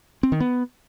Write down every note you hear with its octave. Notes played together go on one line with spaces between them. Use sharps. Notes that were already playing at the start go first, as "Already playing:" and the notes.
C4
D#3
B3